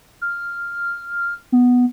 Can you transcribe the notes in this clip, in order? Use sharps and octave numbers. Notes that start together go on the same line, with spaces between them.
F6
B3